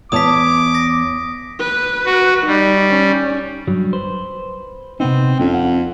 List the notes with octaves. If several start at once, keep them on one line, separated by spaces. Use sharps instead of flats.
E2 C#5 A5 D6 D#6 B6
A#6
B4
F#4
G3 D#4
C#4
G2 F#3
B4 C5
C3 B3 C4 D#4
F2 C4 C#4
F#5